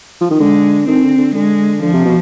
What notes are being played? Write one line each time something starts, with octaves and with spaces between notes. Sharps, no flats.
F3
D#3
D3 G#3
D#3 C4
D3
D3
D3 G#3
D3 F3
C3
B2